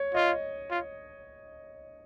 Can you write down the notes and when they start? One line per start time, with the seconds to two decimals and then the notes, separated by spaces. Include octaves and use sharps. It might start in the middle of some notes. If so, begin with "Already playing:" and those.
Already playing: C#5
0.14 F4 D#5
0.71 F4